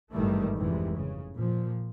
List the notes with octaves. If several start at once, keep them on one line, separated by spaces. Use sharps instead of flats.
G#1 G2 D#3 E3 G3 A3
F1 F2 C3 E3 G3 G#3
C#3
A#2 F3